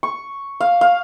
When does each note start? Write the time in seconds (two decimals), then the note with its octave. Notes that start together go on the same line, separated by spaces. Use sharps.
0.03 C#6
0.60 F5
0.81 F5